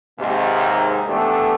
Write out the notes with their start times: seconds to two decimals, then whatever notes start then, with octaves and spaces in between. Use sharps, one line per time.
0.20 D#2 G#2 C3
1.08 E3 A3 B3 D4 G4 A4